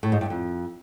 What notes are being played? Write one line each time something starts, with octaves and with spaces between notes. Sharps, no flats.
A2
G#2
G2
F2